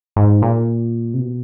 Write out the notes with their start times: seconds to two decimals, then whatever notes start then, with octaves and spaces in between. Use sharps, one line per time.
0.16 G#2
0.42 A#2
1.14 C3
1.20 B2